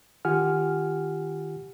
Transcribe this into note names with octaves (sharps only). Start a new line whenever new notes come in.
D#3 F4 G4 F#5 G#5 F6